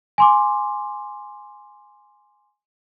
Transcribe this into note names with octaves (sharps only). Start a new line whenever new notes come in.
G#5 C6 D6